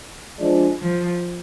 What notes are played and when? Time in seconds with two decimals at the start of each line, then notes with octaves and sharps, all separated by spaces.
0.39 F3 G#3 D4
0.80 F3